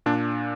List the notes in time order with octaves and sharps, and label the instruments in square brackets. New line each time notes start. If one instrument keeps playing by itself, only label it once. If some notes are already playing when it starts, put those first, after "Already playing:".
[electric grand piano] A#2 D4